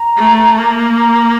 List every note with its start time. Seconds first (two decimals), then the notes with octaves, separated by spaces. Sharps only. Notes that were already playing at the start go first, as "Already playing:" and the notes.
Already playing: A#5
0.17 A3
0.58 A#3
0.98 A#5